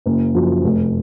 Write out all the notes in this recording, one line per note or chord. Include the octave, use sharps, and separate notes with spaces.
F#1
F#2 F3
F1